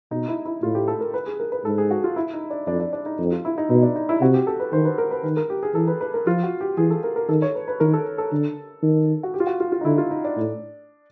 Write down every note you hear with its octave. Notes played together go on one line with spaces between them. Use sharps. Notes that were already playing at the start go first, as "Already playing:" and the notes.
B2 D#4
E4
E4
A2 F4
G4
A4
A#4
B4
G#4
A#4
B4
G#2 A4
G#4
F#4
F4
E4
D#4
D4
F2 D4
D4
D4
D#4
F2
F4
E4
D#4
B2 D#4
D4
D#4
E4
C3 F#4
G4
A4
B4
D#3 C5
B4
A#4
B4
D#3 B4
A#4
G4
G#4
E3 A4
B4
B4
A#4
F3 F4
F#4
G4
E3 G#4
A4
A#4
A#4
D#3 A4
C#5
B4
B4
D#3 A#4
A4
A4
D3
D#3
F#4
G4
F4
F#4
F4
F4
D#4
D3 E4
F4
D#4
D4
A2